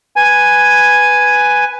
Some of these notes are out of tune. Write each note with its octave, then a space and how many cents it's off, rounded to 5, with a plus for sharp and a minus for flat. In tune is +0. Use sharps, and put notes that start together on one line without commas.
B4 +5 G#5 +0